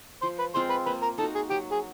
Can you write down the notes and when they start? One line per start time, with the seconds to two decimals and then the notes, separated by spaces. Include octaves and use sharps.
0.22 F3 C5
0.39 B4
0.55 G#3 C4 F4 C5
0.70 B4
0.86 A#3 B4
1.02 A#4
1.18 D#4 A4
1.23 F#4
1.35 G#4
1.50 F#3 G4
1.72 G#4